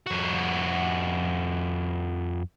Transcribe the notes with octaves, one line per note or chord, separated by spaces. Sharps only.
F2 F#4